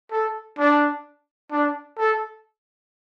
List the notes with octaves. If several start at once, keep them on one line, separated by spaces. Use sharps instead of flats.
A4
D4
D4
A4